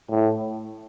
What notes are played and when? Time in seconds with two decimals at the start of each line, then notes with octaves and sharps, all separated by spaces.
0.11 A2